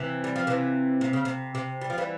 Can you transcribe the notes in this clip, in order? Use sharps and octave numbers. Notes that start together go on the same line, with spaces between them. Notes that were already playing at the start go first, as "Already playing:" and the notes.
Already playing: C3 E3
G3
F3
C3 E3
C3
C#3
C3
C3
G3
F3
E3 G3